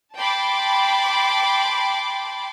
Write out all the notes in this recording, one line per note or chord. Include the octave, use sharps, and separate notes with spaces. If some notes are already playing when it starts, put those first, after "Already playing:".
G5 A5 B5 C6 D6